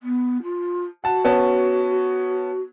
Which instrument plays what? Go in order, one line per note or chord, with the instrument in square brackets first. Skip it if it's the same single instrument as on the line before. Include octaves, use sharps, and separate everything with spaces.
[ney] B3
F4
[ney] F#4 [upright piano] F#5 A5
[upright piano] B3 C#4 A5